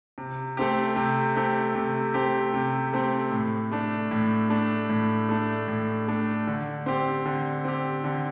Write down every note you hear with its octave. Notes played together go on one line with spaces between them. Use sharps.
C3
A3 C4 G4
C3
A3 C4 G4
C3
A3 C4 G4
C3
A3 C4 G4
A2
A3 D4
A2
A3 D4
A2
A3 D4
A2
A3 D4
D3
C4 G4
D3
C4 G4
D3